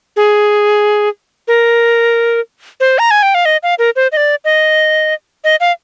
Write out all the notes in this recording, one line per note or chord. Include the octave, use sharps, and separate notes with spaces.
G#4
A#4
C5
A#5
G#5
G5
F5
D#5
F5
A#4
C5
D#5
D5
D#5
D#5
F5